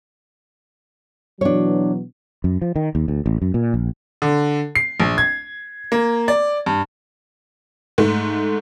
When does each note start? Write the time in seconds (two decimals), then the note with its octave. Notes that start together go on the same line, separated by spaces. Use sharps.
1.41 B2 E3 F#3 D4 C#5
2.44 F#2
2.62 F3
2.76 D#3
2.95 D#2
3.08 D2
3.26 A1
3.42 F#2
3.54 A#2
3.74 A#1
4.22 D3
4.75 C7
5.00 A#1
5.18 G#6
5.92 A#3
6.28 D5
6.66 G2
7.98 G#2 A3